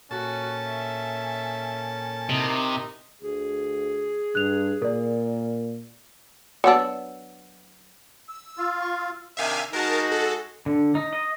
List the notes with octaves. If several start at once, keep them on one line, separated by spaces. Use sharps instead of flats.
A#2 C#4 F#4 A4 A5
E5
C3 D#4 E4 A#4
D2 G#4
G2 F#6 F7
A#2 A#4 D5
F#3 B3 D4 F#5 E6
E6
F4
C#6
E6
C3 D#3 D4 E5 F5 G#5
G#3 D#4 F#4 A#4 A5
A4
D3
D#4
D#5